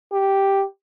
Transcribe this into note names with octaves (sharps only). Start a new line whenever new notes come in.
G4